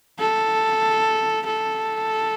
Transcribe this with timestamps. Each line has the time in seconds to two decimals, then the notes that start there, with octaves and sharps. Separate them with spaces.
0.19 A4
1.46 A4